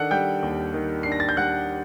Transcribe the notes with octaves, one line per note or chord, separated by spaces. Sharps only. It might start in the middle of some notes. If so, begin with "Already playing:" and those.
Already playing: D#3 D4 A4 F#5 F#6
G3 G5 G6
D#2
D#3
D4 C7
A#6
A6
G6
G3 F#5 F#6